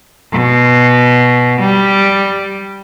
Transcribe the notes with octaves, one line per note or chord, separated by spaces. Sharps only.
B2
G3